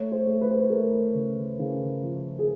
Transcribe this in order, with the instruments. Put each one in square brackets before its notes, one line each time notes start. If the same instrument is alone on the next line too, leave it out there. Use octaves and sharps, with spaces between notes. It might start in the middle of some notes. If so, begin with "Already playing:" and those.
Already playing: [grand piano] A3 C#5
C5
A3
B4
C5
B4
A3 A#4
C#3
C#3
F3
G#4